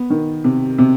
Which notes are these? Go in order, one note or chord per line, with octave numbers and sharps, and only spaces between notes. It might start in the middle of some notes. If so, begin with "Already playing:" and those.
Already playing: B3
D#3
C3
C3